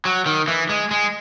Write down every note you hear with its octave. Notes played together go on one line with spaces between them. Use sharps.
F#3
D#3
E3
G#3
G#3